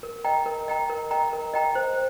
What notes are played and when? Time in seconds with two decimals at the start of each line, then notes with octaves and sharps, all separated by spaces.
0.03 A#4
0.25 D#5 G5 A#5
0.46 A#4
0.68 D#5 G5 A#5
0.89 A#4
1.11 D#5 G5 A#5
1.33 A#4
1.54 D#5 G5 A#5
1.75 C5